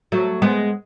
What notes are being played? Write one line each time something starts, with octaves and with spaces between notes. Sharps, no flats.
F#3 A3
G#3 B3